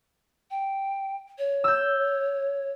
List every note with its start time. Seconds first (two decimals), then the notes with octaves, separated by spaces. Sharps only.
0.51 G5
1.38 C#5
1.64 E6 G6